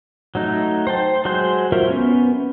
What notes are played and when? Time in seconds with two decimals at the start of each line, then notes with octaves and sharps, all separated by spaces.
0.35 F#3 A3 D#4
0.87 C5 G5 A5
1.25 F#3 G#3 C5 C6 G6
1.72 F4 F#4 A#4 C5 E5
1.88 B3 C#4